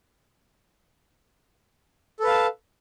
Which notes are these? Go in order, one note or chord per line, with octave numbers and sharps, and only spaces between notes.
A4 B4 F5 A5